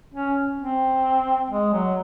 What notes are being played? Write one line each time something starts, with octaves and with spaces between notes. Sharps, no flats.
C#4
C4
G#3
F#3